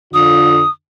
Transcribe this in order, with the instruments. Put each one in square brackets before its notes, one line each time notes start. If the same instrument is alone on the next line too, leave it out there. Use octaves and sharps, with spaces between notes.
[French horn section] F2 D3 F4 [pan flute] D#6